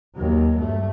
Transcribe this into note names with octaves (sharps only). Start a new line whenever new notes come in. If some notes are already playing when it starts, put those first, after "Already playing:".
D#2 F#3
G2 A3